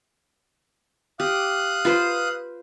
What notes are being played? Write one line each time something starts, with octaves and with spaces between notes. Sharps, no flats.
G4 F5 D#6 F#6
F4 B4 C5